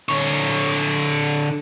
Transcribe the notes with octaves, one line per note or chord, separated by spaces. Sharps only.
D3 C#5